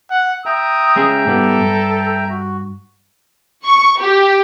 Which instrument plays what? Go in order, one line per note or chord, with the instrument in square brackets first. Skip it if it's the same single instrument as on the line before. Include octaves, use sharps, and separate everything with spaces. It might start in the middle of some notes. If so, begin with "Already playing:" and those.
[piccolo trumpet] F#5
[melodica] E5 G5 A#5 [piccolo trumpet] D#6
[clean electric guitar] G#3 C#4 G#4
[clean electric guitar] G#2 G3 B3 [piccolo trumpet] A4
[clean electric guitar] G2
[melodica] F#4
[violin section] C#6
G4